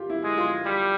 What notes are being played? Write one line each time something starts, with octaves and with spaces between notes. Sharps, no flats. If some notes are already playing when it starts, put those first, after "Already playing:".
Already playing: F4 G4
E4
G#3
F4
G3